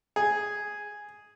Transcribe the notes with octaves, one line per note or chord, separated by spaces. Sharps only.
G#4